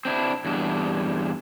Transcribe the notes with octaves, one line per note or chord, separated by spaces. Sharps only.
C4 D4 E4
E2 G2 D4